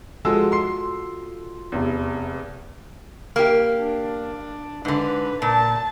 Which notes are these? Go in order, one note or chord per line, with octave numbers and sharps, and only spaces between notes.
F3 G#3 F4 F#4 A4 E6
C6 C7
F1 E2
A#3 G4
D4
G#2 D3 B4
A#2 A5